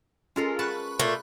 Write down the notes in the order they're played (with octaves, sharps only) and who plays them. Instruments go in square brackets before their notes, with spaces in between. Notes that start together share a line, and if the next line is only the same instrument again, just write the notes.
[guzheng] G#3 A#4 F5 [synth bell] C#4 F4 A4
[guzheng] B4 F#5 A5 [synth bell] B5 C#6 F#6
[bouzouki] A#2 A3